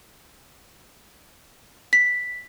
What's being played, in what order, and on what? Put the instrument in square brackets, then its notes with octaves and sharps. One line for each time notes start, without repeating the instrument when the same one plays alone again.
[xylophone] B6